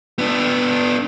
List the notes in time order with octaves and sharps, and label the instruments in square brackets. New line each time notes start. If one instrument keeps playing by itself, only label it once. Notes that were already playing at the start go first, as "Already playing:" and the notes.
[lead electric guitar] B3 D4